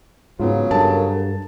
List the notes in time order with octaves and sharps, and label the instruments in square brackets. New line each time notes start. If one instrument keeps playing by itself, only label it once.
[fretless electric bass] G#2 [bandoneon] C#3 F#3 [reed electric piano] B3 F4
[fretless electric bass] G2 [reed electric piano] A4 A#4 [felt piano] A5